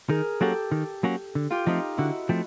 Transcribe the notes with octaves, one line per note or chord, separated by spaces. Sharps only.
D#3 G#4 A#4
F#3 A#3 C#4 F#4 G4 A4
D#3
F#3 A#3 C#4 F#4
D3
F4 G4
F3 A3 C4 D#4 F4
D3 E4 F#4
F3 A3 C4